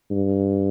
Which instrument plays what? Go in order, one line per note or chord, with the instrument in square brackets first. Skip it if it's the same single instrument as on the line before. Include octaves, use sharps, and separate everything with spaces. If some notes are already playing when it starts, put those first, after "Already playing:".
[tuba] G2